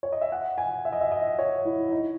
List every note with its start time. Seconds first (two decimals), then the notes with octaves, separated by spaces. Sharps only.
0.03 C#5
0.12 D#5
0.21 E5
0.32 F#5
0.58 G#5
0.85 E5
0.93 D#5
1.01 E5
1.12 D#5
1.39 C#5
1.65 E4
1.91 D#4